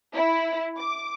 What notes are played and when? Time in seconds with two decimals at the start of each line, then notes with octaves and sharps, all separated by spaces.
0.14 E4
0.79 D6